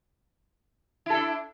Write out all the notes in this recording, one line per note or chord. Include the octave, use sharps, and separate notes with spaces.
D4 E4 A4